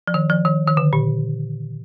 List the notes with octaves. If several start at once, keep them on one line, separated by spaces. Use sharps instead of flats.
F3
D#3
F3
D#3
D#3
D3
A#2